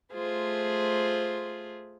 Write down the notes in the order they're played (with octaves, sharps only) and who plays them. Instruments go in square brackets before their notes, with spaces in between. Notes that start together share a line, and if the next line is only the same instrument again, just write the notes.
[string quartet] A3 F4 G#4 C5